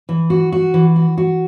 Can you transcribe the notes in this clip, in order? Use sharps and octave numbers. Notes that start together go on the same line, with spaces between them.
E3
F#4
F#4
E3
F#4
F#4